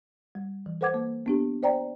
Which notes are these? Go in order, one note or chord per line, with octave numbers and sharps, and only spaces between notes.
G3
E3
A4 B4 C5 F#5 D6 G#6
A#3
B3 D4 G4
C5 D5 G5 A#5